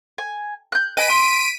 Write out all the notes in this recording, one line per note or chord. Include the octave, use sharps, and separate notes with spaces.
G#5
F#6 G6
B4 D#5 G#5 B6 D7 D#7
C6